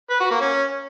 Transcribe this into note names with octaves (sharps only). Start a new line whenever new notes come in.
B4
F#4
A#3
C#4